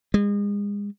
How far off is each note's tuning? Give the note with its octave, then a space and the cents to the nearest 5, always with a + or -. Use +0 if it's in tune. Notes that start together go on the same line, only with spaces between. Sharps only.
G#3 -35